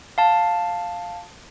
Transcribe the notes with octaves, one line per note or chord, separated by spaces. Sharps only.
F5 A5